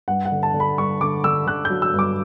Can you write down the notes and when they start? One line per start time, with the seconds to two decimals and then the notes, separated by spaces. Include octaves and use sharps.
0.08 G2 F#5
0.25 F#5
0.32 D3
0.43 A5
0.54 D3
0.60 B5
0.78 G2 C#6
1.01 D3 D6
1.24 D3 E6
1.47 D3 F#6
1.65 F#3 G6
1.82 E6
1.94 G2 D6